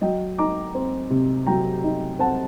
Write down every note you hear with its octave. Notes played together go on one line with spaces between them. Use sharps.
F#3 D#5 G5
D#4 A#5 D6
C4
C3
F#3 G5 A#5
D#4
C4 F#5 A5